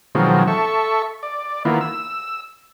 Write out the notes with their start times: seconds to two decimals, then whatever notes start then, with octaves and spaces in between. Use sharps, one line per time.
0.15 B2 D#3 F3 F#3 G#3 C4
0.47 A4 E5 C#6
1.23 D5
1.65 D#3 A#3 B3 E4 F4
1.81 E6